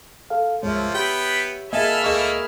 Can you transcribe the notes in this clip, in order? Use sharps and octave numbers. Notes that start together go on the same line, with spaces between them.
A4 F5
C#2 G2 F3 G#3 A#3 C#5 E5
B3 G4 G5 B5
A#3 G#4 A4 D#5 E5 G#5 B5 F6
D2 A3 A#3 G#4 A#4 D#5 C#6